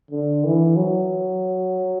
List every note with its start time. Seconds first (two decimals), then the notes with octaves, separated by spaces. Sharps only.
0.11 D3
0.44 E3
0.77 F#3